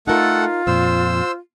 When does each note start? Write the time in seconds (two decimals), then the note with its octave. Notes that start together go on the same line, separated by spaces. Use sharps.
0.07 A3 D#4 F4 A4 A#4 F#5
0.67 F2 A#2 C5 E6